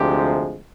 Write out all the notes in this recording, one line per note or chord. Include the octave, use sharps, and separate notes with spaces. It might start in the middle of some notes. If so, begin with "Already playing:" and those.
Already playing: D2 C3 F3 G#3 G4